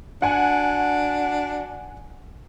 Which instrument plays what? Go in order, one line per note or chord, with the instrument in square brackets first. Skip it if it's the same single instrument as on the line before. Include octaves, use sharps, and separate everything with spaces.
[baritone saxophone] D4 [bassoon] F#4 [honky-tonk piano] F#5 G#5